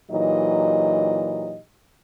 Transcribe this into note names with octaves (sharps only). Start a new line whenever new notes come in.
A#2 E3 F#3 D#4 G4 D#5